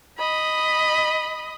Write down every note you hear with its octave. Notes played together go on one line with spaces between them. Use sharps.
D#5 B5